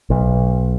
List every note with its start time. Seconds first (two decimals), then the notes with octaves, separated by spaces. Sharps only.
0.10 B1